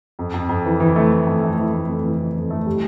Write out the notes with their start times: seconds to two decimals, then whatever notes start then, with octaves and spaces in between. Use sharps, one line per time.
0.19 F2
0.34 F2
0.49 F2
0.65 E3
0.80 E3
0.96 A3
1.12 A3
1.27 F2
1.43 A3
1.58 E3
1.73 A3
1.89 F2
2.04 E3
2.20 F2
2.36 F2
2.50 A3
2.66 G3